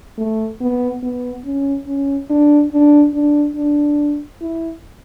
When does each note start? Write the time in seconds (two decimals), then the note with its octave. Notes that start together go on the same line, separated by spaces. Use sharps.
0.18 A3
0.61 B3
1.03 B3
1.45 C#4
1.87 C#4
2.30 D4
2.72 D4
3.14 D4
3.56 D4
4.41 E4